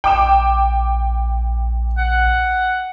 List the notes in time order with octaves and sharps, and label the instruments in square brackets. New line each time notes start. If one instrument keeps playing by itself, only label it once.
[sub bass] A#1 [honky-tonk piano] G5 D6 E7
[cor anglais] F#5